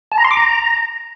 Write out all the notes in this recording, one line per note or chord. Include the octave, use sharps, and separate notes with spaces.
A5
A#5
C6
D6
A#5